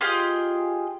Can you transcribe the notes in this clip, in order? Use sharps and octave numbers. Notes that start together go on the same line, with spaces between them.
F4 G4 G#4 D#5